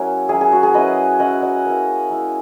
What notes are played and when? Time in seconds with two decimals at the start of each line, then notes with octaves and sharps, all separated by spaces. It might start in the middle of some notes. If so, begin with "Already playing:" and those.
Already playing: F#3 A#3 C#4 E4 G#4
0.29 F#3 C#4 E4 G#4
0.41 G#4
0.52 F#4
0.63 G#4
0.74 F#3 C#4 E4 B4 D#5
1.19 F#3 C#4 E4 D#5 F#5
1.42 D#5 F#5
1.65 A#3 E4
2.10 A#3 E4